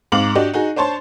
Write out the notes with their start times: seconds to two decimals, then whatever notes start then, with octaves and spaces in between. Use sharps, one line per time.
0.12 G#2 C4 F5 D6 F#7
0.35 D4 F#4 G4 D#5
0.54 D#4 F#4 G#4
0.76 D4 C5 C#5 A5 C6